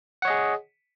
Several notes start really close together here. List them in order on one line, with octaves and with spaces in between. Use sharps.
F#5 C#5 D#5 G#4